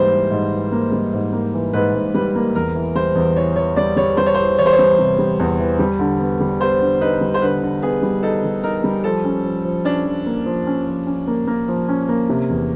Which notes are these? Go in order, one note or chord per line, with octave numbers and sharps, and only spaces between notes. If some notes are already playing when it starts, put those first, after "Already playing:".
Already playing: G#2 E3 G3 A#3 C5
E3
G#2
E3
A#3
G3
G#2
A#3
E3
G#2 B4
G#2
G3 B4
A#3
E2 A#4
E3
G3 C5
E2
E3 C#5
E3 C#5
G3 D5
G3 C#5
G3 C5
C#5
E3 C5
E3 C#5
C5
C#5
G3
C3
G3
E2
E3
G3
D3
B3
G3
B3 C5
D3
D#4 B4
G3
C5
D3 B4
D3
B3 G#4
G3
D#4 A4
G3
D#4 A#4
G3
F3 A4
C#4
F3
F3
C#4 D4
F3
A#3
F3
C#4
F3
C#4
A#3
A#3
F3
C#4
A#3
C3
E2